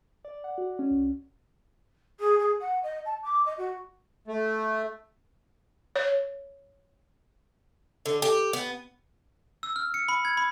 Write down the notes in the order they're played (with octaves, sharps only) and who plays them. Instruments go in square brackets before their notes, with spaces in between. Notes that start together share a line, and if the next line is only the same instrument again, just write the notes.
[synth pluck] D5
F#5
F#4
C#4
C2
[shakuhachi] G#4
G#4
F#5
D#5
A5
D6
D#5
F#4
[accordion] A3
[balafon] C#5
[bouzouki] D3
G4
B3
[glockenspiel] E6
F6
C#7
B5
G#6
B5